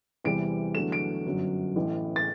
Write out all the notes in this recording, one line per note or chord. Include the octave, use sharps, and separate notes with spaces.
E2 C3 E3 G3 C4 D7
E2 D3 F#3 A3 E7
D7
G1 F#2 F#3
A1 A2 E3
A6